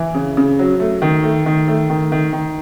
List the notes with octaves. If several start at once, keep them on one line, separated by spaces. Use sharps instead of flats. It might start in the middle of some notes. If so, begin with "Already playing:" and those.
Already playing: E3
C#3
C#3
F#3
A3
D#3
A3
D#3
A3
D#3
D#3
D#3